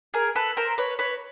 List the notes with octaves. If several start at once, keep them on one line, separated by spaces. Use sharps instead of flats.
G#4 A#4
A4 B4
A#4 C5
B4 C#5
B4 C#5